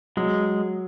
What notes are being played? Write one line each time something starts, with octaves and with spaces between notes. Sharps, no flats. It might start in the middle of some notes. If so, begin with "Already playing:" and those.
F#3 G#3